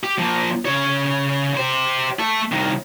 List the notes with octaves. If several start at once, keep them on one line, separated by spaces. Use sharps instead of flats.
G4
F3 A#3
C#3 C#5
G4 C5
A3 A4
C2 D#3